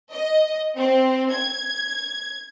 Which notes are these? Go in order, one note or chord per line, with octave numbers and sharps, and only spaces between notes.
D#5
C4
G#6